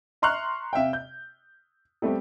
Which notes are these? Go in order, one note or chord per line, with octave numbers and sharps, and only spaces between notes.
E5 A#5 C6 C#6 F6 F#6
C3 E5 F5 G5
G6
G3 A3 B3 C4 G4